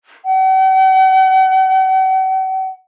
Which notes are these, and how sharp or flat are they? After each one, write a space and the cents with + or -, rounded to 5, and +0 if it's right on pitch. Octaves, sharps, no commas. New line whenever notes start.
F#5 +45